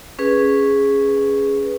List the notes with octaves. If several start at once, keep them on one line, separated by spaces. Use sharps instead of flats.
C#4 G#4 B4